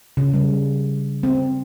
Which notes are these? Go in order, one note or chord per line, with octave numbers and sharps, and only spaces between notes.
C#3
G3
C4